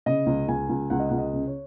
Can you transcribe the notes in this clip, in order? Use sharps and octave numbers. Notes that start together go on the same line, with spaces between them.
C#3 D#5
C#2
C#2 G#5
C#2
C#2 F#5
D#5
C#2 F#5
D#5
C#3
C#5